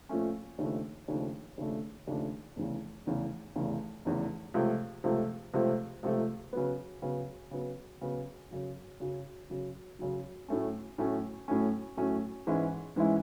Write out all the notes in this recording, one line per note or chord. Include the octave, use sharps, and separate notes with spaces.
A#2 F3 A3 C#4
D#2 C#3 F3 A3 D4
D#2 C#3 F3 A3 D4
D#2 C#3 F3 A3 D4
D#2 C#3 F3 A3 D4
F1 E2 C#3
F1 E2 C#3
F1 E2 C#3
F1 E2 C#3
C#2 C3 F3 A3
C#2 C3 F3 A3
C#2 C3 F3 A3
C#2 C3 F3 A3
C#3 F#3 B3
C#3 F#3 B3
C#3 F#3 B3
C#3 F#3 B3
F#2 C#3 F#3
F#2 C#3 F#3
F#2 C#3 F#3
F#2 C#3 F#3
A2 F#3 A3 C#4
A2 F#3 A3 C#4
A2 F#3 A3 C#4
A2 F#3 A3 C#4
G#2 E3 G#3 C#4 E4
G#2 E3 G#3 C#4 E4